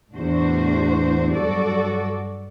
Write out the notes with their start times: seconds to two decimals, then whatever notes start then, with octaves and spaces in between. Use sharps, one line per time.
0.14 E2 A2 D4 F#4 C5
1.32 G2 F#3 F#4 A4 D5